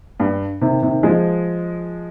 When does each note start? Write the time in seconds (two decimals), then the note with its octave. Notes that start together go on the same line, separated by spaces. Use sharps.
0.20 G2
0.61 C3 D#3
0.83 C3 D#3
1.03 F3 G#3